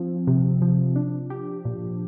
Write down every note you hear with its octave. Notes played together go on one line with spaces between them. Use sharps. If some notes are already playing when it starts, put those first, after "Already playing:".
Already playing: F3 C4
C3
F3
D4
G4
A#2